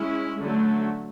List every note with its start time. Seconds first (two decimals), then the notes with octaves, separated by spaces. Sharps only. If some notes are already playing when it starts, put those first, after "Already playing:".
Already playing: G#3 C#4 E4
0.38 D3 F#3 A3